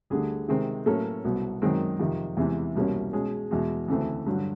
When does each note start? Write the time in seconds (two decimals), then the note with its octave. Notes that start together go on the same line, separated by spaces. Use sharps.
0.10 D2 D3 G3 G#4
0.48 C3 D#3 G#3 C4
0.86 A2 F#3 A#3 C#4 A4
1.24 C2 B2 F#3 B3
1.62 F#2 D#3 G#3 C4
1.99 F2 C3 D#3
2.37 E2 C3 E3 G#3
2.75 C2 B2 G3 A#3 C#4
3.13 B2 G#3 C#4 G#4
3.51 E2 B2 G#3
3.88 D2 C#3 E3 A3 C4
4.26 G2 D3 F#3